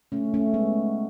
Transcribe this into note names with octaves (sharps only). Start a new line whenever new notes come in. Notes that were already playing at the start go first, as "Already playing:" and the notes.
A3 C#4
A3 C#4
G#3 B3